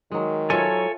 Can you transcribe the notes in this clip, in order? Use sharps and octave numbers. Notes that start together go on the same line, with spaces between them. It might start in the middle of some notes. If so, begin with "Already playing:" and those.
D#3 F#3 G#3
G#2 F#3 A3 F4 A4 C#5 G#5